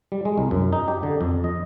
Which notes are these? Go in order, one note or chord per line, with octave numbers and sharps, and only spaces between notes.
G3
G#3
C2
F#2
D#4
G4
D3
F2
D#5